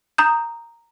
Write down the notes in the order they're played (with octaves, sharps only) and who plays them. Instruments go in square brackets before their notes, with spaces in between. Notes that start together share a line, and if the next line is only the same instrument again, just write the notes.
[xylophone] A#5 D#6 G6